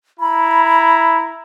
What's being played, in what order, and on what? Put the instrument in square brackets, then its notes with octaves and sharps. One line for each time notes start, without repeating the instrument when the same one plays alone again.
[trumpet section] E4 A#5 [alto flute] B5